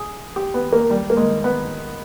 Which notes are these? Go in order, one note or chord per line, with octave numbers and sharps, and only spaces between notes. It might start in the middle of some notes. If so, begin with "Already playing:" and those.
Already playing: G#4
G4
B3
A#3
G3
A#3
G#3
B3